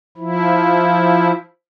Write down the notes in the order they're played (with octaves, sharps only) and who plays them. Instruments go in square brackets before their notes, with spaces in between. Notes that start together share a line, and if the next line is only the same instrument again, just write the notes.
[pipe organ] F3 E4